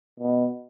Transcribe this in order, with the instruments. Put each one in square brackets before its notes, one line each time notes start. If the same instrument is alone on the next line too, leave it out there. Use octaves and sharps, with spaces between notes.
[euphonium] B2